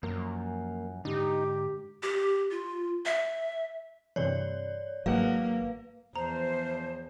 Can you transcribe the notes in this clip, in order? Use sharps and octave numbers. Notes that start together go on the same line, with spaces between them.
F#2 F3 A#3 A#4
G#2 D3 D#4 G4
G4
F4
E5
G2 C3 E3 C#5 D5
G#1 G#2 F#3 A#3 B4 F5 F#5
E2 F3 C5 A#5